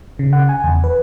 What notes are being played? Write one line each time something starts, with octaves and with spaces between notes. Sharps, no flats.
C#3
F#5
G#5
E2
B4